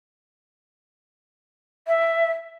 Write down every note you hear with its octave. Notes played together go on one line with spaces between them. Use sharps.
E5